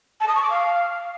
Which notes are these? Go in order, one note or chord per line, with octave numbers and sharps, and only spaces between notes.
A5
D#6
C#6
D6
F5